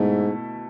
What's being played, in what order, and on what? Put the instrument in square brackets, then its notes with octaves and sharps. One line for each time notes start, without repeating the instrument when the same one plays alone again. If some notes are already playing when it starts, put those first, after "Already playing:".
Already playing: [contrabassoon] G#2 [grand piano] B2 A3 E4